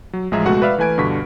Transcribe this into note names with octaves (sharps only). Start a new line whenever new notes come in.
F#3
A1 F3 G#3 G#4 E5 A#5
C#2 B2 G#3 A3 F#4 F#5
B4 D5 E5 F5 F6
E3 A3 B4 G#5 G#6 D7
G2 B2 D3 C#6 B6